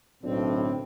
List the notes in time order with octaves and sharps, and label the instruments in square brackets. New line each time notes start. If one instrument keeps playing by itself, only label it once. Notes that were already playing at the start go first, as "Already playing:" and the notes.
[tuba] B1 [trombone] A2 [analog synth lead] D3 [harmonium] C4